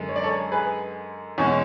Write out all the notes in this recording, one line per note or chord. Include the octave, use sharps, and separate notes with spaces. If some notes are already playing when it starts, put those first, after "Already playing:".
Already playing: F#2 D3 G#3
C#5
D5
A4 C#5
G#4 B4
E2 B2 G#3 C#4